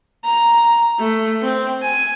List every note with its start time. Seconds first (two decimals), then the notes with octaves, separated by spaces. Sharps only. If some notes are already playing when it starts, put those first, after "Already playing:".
0.24 A#5
0.99 A3
1.42 C4
1.82 G#5